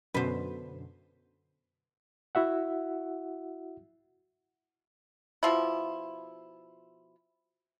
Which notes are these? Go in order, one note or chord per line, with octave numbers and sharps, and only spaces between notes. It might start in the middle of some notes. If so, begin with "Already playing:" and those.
F#2 B2 D3 B4 C5
E4 F#4 E5 F#5
B2 F3 E4